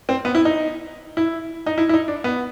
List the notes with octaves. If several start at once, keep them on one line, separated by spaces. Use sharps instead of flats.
C4
B3
E4
D#4
E4
D#4
E4
E4
D#4
D4
B3